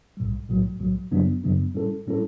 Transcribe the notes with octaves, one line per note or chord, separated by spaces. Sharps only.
B1 A2 G3
B1 A2 F#3
B1 A2 F#3
F#2 C#3 F#3 B3 D4
F#2 C#3 F#3 B3 D4
A2 G3 C#4 E4 A4
A2 G3 C#4 E4 A4